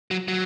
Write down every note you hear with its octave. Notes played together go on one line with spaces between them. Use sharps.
F#3
F#3